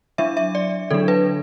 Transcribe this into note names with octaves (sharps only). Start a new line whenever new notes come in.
F#3 D4 E5
E5
D5
D3 F#3 D4 A4
B4